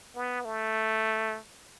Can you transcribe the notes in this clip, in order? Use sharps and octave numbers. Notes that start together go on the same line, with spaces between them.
B3
A3